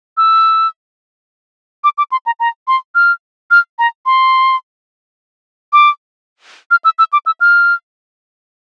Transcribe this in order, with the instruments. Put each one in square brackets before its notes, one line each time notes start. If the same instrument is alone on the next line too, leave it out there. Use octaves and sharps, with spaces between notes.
[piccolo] E6
D6
D6
C6
A#5
A#5
C6
F6
F6
A#5
C6
D6
F6
E6
E6
D6
E6
F6